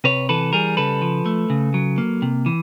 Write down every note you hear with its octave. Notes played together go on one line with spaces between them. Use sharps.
C3 B4 C#5
E3 A4 B4
G3 G#4 A#4
C#3 A4 B4
F3
A3
C#3
F#3
A#3
C3
E3